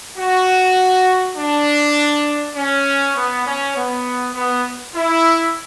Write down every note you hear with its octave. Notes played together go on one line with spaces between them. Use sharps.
F#4
D4
C#4
B3
C#4
B3
B3
E4